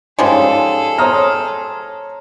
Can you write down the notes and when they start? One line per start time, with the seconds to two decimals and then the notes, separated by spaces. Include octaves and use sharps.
0.19 G#2 F3 G3 G#3 C#4 G#4 A4
0.98 C5 C#5 A#5 D#6 F6